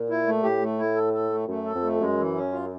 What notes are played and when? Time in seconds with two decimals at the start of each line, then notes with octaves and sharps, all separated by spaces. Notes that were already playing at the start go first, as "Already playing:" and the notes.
Already playing: A#2
0.09 E4
0.26 A3
0.43 A2 G4
0.61 A3
0.78 E4
0.96 A4
1.13 A4
1.30 A3
1.48 F#2 A3
1.66 A4
1.74 F2
1.82 A3
2.00 F#2 G#3
2.18 E3
2.35 C#4
2.52 F4